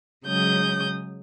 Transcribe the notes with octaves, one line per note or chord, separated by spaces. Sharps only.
C#3 F#3 G#3 D#6 G6